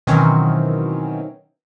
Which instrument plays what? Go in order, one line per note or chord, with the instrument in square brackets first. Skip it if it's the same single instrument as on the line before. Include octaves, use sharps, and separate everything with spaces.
[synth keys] B2 D#3 E3 F#3 C4 C#4